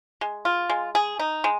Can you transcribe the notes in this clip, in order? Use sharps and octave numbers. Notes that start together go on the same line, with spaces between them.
G#3
F4
G#3
G#4
D#4
G#3